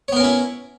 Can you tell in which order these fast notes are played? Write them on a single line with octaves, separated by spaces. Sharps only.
C#5 B3 A#4 C#4 E4